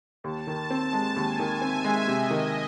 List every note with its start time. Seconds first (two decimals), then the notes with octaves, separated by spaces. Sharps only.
0.24 D#2 A5
0.47 D#3
0.70 C4 A5
0.93 G#3
1.16 D#2 G#5
1.39 D#3
1.61 C4 E5
1.84 G#3
2.07 C3 D#5
2.30 D#3